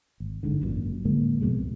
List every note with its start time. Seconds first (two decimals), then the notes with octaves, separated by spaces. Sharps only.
0.20 G#1
0.43 F#1 G#2 D3
0.61 G#1 F#2 A#2
1.05 A2 D3 G#3 A#3
1.41 C2 F2 B2 G#3